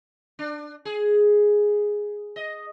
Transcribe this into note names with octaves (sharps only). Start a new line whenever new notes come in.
D4
G#4
D#5